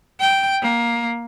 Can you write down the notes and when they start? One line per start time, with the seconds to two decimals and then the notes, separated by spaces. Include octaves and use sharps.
0.20 G5
0.62 A#3